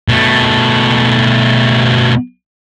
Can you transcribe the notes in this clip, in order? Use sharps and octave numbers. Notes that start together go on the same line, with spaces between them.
B2 A3